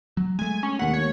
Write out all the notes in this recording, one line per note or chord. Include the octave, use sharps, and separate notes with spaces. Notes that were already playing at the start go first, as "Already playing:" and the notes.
F#3
G#3 A3 G#5
C#4
D#2 F#5 B6
C#5